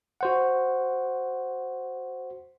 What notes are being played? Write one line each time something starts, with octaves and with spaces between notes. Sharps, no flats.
F#4 C5 F#5